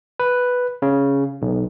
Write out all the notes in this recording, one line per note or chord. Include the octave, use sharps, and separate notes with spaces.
B4
C#3
B1